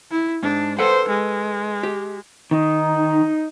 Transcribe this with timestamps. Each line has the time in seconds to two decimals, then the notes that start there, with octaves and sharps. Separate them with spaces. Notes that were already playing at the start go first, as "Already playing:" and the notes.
0.11 E4
0.43 G#2 D4
0.79 A4 B4 C5 F#5
1.09 G#3
1.83 G4
2.51 D#3 D#4